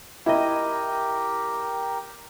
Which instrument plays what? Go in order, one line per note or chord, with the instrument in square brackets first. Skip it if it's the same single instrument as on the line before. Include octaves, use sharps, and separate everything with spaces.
[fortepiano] E4 D#5 [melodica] G4 A#4 G5